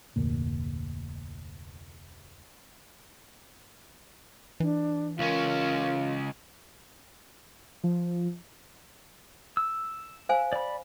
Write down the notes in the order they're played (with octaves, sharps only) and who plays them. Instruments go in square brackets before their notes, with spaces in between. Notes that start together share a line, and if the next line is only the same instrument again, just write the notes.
[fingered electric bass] F1 D2 A#2
[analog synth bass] E3 [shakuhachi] D4
[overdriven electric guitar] C#2 C#4 [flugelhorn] F4 [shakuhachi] A#4
[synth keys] F3
[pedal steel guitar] E6
[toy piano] C5 F5 G#5
[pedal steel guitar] D5 B5